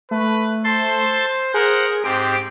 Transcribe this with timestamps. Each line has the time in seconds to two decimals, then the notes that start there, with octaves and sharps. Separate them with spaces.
0.11 A3 B4
0.64 A4 C5 C6 A6
1.54 G#4 A#4 C5 F#5
2.04 G#2 C4 G4 D7